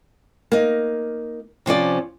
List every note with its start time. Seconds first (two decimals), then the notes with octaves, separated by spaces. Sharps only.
0.52 A#3 D#4
1.66 C3 F3 C#4 D5